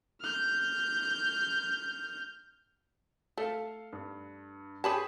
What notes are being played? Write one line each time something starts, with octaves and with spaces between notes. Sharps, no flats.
F6 G6
A3 A4 F5
G2
G4 G#4 B4 C#5 G#5 A5